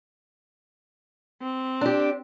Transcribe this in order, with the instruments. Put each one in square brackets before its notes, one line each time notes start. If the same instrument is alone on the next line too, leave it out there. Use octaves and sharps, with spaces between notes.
[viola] C4
[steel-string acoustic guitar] D4 G4